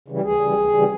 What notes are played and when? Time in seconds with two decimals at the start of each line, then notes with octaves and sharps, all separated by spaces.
0.08 C#3 E3 G3
0.25 D2 G#4
0.41 C#3 E3 G3
0.57 D2
0.74 C#3 E3 G3